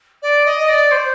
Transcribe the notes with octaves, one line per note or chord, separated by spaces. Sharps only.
D5
D#5
D5
C5